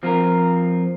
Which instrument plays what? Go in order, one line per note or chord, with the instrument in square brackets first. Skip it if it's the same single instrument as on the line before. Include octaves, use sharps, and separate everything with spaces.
[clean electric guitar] F3 C4 F4 A#4